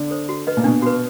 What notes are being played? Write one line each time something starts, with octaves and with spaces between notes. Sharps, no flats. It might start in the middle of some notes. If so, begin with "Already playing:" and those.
Already playing: D3
A4 C5
F#4
B4 D#5
A#2
B2 D4
F#4 B4